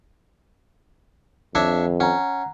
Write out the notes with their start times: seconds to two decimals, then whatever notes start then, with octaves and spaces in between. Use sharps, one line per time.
1.55 F2 D4 C#5 E5
2.00 C#4 F#5 A#5